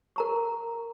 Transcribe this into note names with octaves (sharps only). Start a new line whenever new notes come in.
A#4 A#5 C#6